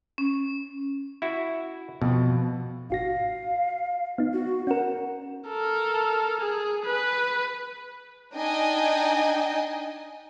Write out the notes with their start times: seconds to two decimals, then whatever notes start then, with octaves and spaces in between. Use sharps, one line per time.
0.18 C#4
1.22 E4 F#4
2.02 F2 B2
2.90 G#1 F#4 F5 A#6
4.18 B3 D#4
4.33 F#4
4.67 C#4 A#4 F#5
5.48 A4 A#4
6.40 G#4
6.85 B4
8.34 D4 D#4 D#5 G5 G#5